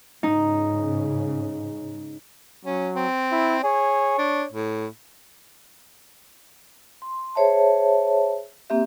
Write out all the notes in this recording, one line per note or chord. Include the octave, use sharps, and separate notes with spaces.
G#2 C#3 D#4
F#3 C#4
C4
E4
G#4 C#5
D4
A2
C6
G#4 C5 C#5 E5 A5
A#3 C4 G4 E5